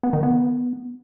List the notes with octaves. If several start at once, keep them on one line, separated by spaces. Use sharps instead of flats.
B3
D#3
B3